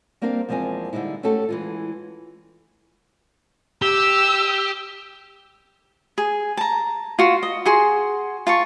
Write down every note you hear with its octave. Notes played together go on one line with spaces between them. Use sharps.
G3 A#3 C4 D4 A#4 F5
E2 F3 G#3 C4 A#4 G#5
D3 G3 G#3 D#4 E4
A3 C#4 F#4 G4 A4
E3 G#3 F4
G4 E6
G#4
A5 A#5
F4 F#4
D#5
F#4 G#4 C6
F4 A5 C#6